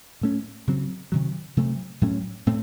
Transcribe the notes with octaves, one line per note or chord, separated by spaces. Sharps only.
A2 A3 C#4
C#3 F#3 C4
C3 D#3 F#3
C3 F#3 A3
A2 F#3 A3 C#4
A2 A3 C4